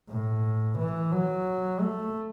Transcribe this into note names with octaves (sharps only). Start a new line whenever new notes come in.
A2
E3
F#3
A3